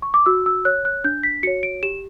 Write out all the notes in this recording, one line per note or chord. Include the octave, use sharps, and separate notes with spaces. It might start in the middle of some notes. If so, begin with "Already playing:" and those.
C#6
D6
F#4 E6
E6
C#5 F#6
F#6
D4 G6
B6
F#4 C#5 C#7
D7
G4 E7